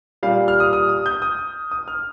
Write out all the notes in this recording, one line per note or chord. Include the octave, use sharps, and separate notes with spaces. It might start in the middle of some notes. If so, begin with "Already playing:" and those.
A#2 G3 F5
F6
D#6
D#6
D#6
G6
D#6
D#6
F6